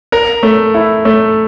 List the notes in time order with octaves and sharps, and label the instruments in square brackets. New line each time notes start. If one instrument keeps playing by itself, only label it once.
[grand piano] A#4
A3
E4
A3